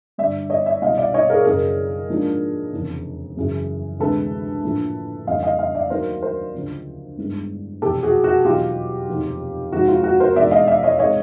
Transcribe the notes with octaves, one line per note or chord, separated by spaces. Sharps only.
G2 D3 G3 D5 E5
C#5 D#5
D5 E5
C2 B2 G3 D#5 F5
D5 E5
C#5 D#5
G#4 A#4
F#1 F#2 C#3 G#4 A#4
G#2 F3 A#3 D4
F1 E2 C#3
F#2 C#3 E3
D2 C3 E3 G#3 A4 B4
A#1 A2 F3 A#3
F2 C#3 E3 G3 A#3 D#5 F5
D#5 F5
D#5 F5
D5 E5
D#2 D#3 F#3 A3 A#4 C5
A#4 C5
D2 C#3 F3
G2 D#3 G#3 B3 E4
F1 E2 B2 G4 A4
F#4 G#4
F#4
E2 B2 F#3 B3 D#4 F4 G4
F1 D#2 D#3
F1 D#2 D#3 G#3 F#4
F4
F#4
A#4 C5
E1 D#2 D#3 G#3 B3 D5 E5
D#5 F5
D5 E5
C#5 D#5
C3 D#3 G#3 C#5 D#5